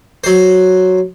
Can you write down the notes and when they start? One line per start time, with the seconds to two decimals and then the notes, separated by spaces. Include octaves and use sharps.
0.24 F#3 C5